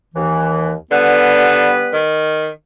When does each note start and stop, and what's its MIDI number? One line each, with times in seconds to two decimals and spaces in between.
0.15 0.74 39
0.15 0.74 52
0.91 1.79 50
0.91 2.02 55
0.91 2.02 59
0.91 2.02 71
1.93 2.49 51